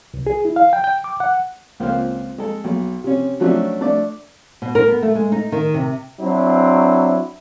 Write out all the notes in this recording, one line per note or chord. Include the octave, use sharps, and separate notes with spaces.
C2
G#4
E4
F5
G5
G5
D6
F#5
C#2 A#3 C4 F4 C5 F5
G#3 A4
B1
C3 C#4
F3 F#3 A3 C#4 D4 E5
A3 D4 D5
B2
A#4
B3
A3
G#3
D#4
D#3
C3
F#3 C4 D4 E4